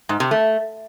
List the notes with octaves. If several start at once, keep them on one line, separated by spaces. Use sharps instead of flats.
G#2
C3
A3